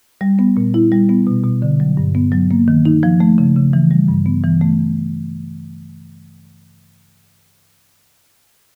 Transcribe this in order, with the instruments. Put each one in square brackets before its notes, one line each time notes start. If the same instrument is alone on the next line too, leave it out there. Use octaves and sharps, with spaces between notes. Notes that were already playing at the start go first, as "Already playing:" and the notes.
[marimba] G3
B3
A#2
E4
G3
B3
B2
B2
D3
F#3
G2
B3
F#3
A#3
D#3
D#4
F3
A3
C#3
C#3
E3
G3
G2
B3
E3
A3